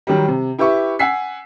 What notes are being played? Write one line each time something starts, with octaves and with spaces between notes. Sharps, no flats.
D#3 F#3 G3
C3
E4 G4 B4 E5 C#6
F#5 G#5 E6 B6 C7